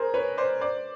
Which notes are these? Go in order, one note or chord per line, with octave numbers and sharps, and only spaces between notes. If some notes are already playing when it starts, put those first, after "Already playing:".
Already playing: G#4 A#4 C5
B4 C#5
C5 D5
C5 D5